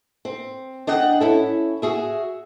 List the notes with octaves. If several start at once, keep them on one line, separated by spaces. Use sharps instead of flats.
C4
D4 D#5 F#5 G5
C#4 E4 A4
F#4 G#4 E5